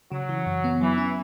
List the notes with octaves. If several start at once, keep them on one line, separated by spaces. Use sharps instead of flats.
C#3 F#3
E3
F#2
B3
E3 F#3
C#4